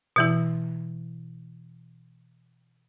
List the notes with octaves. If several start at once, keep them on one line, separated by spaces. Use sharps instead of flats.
B2 E3 E4